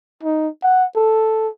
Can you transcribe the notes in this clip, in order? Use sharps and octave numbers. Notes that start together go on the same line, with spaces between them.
D#4
F#5
A4